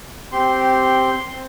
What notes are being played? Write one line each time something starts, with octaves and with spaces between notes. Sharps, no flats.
C4 G4 C6
C4